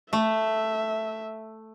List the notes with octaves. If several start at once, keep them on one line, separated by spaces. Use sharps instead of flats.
A3 E5